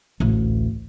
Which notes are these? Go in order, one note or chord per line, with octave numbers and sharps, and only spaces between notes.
A1 D2